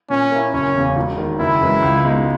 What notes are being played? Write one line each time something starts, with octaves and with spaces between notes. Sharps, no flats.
A#2 C#4
A#3 E4
F#1 C#4
E2 C#3
E1
D#2 D#3
F#1 E4
F#2 E3 G#3
C#2
B2 G#3 D#4